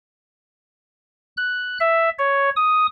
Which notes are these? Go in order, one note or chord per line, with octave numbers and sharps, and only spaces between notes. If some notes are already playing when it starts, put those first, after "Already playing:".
F#6
E5
C#5
D#6